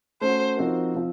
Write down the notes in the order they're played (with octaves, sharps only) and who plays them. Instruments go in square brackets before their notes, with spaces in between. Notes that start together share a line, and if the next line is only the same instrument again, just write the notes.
[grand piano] A3 C#4 F#4 [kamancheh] C5
[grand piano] F3 C4 D#4 F#4 A#4
F3 C4 F4